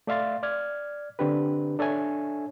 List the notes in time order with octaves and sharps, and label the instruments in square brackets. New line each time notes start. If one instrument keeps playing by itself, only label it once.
[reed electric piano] A3 D5 E5 F5 C6 A6
D5 F6 G#6
D3 C4 D4 G4 B4
D4 A4 C#5 E5 G#5